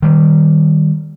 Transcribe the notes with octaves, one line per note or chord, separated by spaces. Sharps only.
D#3 G3